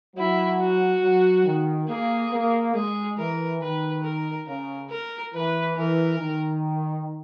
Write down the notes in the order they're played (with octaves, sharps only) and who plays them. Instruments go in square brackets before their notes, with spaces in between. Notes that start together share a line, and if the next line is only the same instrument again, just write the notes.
[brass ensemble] F#3 [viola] E4
[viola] F#4
[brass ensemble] F#3
D#3
[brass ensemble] A#3 [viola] G#4
[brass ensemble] A#3
[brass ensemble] G#3 [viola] G#4
[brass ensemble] E3 [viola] A#4
[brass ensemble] D#3 [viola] B4
[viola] A#4
[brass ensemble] C#3 [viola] A#4
[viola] A#4
[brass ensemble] E3 [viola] B4
[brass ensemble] E3 [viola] A#4
[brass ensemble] D#3